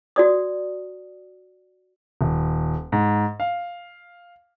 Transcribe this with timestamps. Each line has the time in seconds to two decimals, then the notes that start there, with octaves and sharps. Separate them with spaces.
0.16 F#4 D5 D#6
2.21 D#1
2.92 G#2
3.40 F5